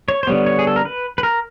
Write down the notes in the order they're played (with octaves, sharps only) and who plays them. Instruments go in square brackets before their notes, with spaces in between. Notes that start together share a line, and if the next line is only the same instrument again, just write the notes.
[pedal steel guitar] C#5
C5
D3 G3 B3 C#5
C#5
G#4
A4
A#4
B4
B4
A#4